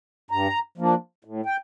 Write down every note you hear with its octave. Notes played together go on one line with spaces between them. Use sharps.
G2 A#5
F3 A#3 D4
A2
G5